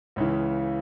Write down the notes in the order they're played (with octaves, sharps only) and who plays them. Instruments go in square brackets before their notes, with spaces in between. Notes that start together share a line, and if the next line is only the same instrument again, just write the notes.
[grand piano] C#2 C#3 E3